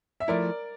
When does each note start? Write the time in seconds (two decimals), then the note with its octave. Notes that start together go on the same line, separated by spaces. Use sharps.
0.20 E5
0.28 F3 A3 E4 A#4 D5